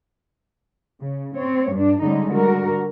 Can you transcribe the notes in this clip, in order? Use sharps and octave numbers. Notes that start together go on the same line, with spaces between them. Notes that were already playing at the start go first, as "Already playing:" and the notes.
C#3
C4 C#5
G2 D4
D3 G3 G#3 C#4 D#4
D3 G3 F#4 A#4